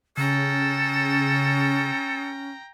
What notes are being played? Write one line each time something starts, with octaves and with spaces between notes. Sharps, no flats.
C#3 C#4 A4 G5 A#5